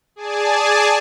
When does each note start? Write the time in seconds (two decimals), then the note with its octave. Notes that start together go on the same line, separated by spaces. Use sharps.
0.16 G#4 D5 G#5 A5